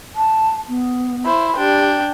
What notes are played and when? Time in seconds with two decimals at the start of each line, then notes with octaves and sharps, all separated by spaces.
0.16 A5
0.68 B3
1.25 E4 C5
1.57 D4 G4 G5